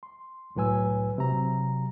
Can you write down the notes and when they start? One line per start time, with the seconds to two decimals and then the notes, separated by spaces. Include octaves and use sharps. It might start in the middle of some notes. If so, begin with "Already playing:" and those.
0.03 C6
0.56 C2 A2 F#3 B4 G#5 E6
1.18 C3 F#3 A#5